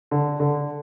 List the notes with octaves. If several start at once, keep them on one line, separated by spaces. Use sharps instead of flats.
D3
D3